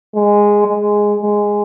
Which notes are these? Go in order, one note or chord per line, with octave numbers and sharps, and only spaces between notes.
G#3
G#3
G#3